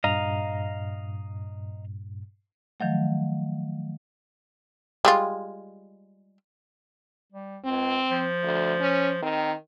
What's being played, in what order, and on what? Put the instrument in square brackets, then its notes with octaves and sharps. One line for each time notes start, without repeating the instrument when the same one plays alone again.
[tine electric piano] G2 A#2 [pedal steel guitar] D#5 F5 A#5
[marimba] D#3 F3 F#3 A3
[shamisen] G3 G#3 F4
[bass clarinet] G3
[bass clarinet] C#2 [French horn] C4
[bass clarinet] F3
[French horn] D2
C#4
[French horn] D#3 [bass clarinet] C4